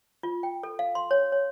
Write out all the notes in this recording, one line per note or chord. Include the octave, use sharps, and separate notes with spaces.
F4
G5
A4
F5
C6
C#5
C#5